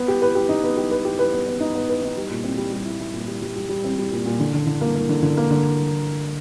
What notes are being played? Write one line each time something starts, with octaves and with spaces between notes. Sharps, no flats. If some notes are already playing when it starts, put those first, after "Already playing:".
Already playing: B3
G4
B4
G4
D#4
B3
G4
B4
G4
B4
B3
B3
D#4
B3
B4
D#4
G3
A#2
C4
G3
G3
E4
E4
A#2
G3
G3
G3
G3
C4
G3
A#2
A#2
D3
D3
D3
A#3
A#3
D3
D3
A#3
D3